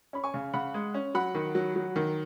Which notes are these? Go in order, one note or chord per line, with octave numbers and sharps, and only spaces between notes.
C#4 B5
G#5 C#6
C#3
C#3 F#5 B5
G#3
C#4
F#3 F#5 B5
D#3
F#3
F#3
D#3